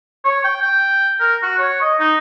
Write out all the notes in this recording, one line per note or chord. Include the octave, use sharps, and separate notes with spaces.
C#5
G5
G5
A#4
F#4
C#5
D#5
D#4